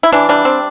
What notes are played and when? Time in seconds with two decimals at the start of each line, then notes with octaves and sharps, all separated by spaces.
0.03 E4
0.12 E3 D4
0.29 G3 D4
0.45 C4